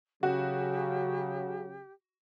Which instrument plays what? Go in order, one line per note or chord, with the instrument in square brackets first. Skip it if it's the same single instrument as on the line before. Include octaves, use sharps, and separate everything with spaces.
[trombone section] C#3 [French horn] F#3 [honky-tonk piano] F#4 [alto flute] G4